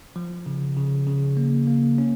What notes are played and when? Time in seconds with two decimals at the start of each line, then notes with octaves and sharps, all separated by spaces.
0.16 F3
0.46 C#3
0.76 C#3
1.07 C#3
1.37 A#3
1.67 A#3
1.98 C#4